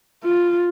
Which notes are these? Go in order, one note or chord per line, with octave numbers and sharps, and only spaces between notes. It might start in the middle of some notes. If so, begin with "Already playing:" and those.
F4